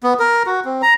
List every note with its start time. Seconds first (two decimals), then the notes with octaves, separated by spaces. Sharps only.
0.03 B3
0.19 A#4
0.46 F#4
0.65 C4
0.82 A#5